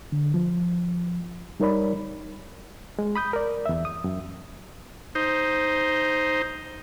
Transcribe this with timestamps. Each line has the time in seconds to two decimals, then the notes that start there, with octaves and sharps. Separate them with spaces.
0.12 D3
0.34 F3
1.60 G3 D#4 A#4 C#5 D5 B5
2.99 G#3
3.16 B5 D#6 G6
3.33 A#4 D5
3.66 E2 E5
3.85 D#6
4.04 F#2
5.15 D#4 C5